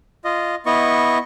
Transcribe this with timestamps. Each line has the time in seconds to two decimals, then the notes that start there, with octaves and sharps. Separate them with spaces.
0.25 F4 D#5
0.66 B3 E4 D#5 C#6